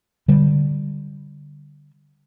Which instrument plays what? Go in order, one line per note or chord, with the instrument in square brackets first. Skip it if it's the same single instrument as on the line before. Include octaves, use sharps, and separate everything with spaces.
[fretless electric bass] D3 G3